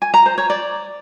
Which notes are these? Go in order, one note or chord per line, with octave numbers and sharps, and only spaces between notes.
G#5
A#5
C5
C#5
D5